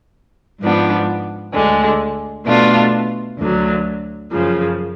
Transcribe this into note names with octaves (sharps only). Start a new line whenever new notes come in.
G#2 F3 B3 D4
D2 D3 G#3
B2 A3 D4 F4
D2 D3 F#3
F#2 C#3 F3